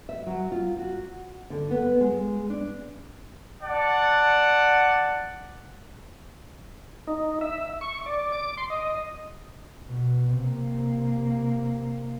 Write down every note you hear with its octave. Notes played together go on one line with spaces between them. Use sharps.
E5
F#3
F4
F#4
D3
B3
G#3
D4
D5 F#5 A5
D#4
E5
C#6
D5
D6
C6
D#5
B2
C3 A#3